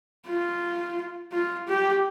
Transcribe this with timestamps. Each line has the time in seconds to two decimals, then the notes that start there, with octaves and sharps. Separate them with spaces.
0.27 F4
1.32 F4
1.67 G4